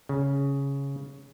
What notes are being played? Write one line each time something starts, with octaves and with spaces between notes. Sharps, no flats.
C#3